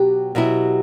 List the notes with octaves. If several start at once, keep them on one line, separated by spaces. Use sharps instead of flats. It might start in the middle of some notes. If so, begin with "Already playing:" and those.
Already playing: B2 F#3 G4
B2 F#3 B3 E4